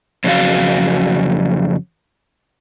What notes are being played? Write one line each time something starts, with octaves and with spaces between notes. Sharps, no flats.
F2 C#3 F#3 D4 F#4 F5